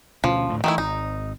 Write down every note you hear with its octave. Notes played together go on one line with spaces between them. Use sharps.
D2 B2 F3 C#4
D2 A2
D#3 E3 A3 E4
G#1 D#4